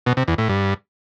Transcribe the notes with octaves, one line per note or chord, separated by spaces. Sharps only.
B2
C3
E2
A2
G2